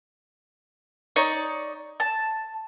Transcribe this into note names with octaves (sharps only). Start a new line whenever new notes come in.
D#4 C#5 D5
A5